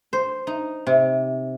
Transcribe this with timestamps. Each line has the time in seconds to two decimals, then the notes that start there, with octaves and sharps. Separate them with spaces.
0.13 C5
0.47 D#4
0.87 C3